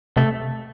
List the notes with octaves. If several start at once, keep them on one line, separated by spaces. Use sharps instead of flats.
C3 A3